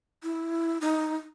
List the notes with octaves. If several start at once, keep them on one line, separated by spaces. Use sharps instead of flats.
E4
D#4